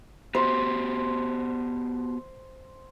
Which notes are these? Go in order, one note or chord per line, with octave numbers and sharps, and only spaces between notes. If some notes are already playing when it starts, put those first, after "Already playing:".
B3 F#4 G4 C5